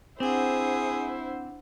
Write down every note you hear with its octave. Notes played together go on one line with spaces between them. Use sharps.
C4 D4 E4 G#4 C5 F#5